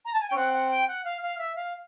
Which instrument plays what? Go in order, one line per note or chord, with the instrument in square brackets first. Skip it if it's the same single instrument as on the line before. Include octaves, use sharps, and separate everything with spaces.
[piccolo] A#5
A5
G#5
G5
[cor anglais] C#4
[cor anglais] C4 [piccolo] F#5
[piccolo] F#5
G5
F#5
F5
F5
E5
F5